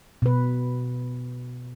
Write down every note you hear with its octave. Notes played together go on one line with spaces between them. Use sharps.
B2 B4